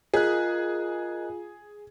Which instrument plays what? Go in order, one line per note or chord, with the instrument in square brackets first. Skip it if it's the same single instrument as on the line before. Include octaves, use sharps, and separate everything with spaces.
[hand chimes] F4 [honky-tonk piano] G#4 [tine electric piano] A#4 D#5 F#6